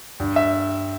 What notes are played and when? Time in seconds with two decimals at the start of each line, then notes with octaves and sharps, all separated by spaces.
0.20 G2
0.36 E5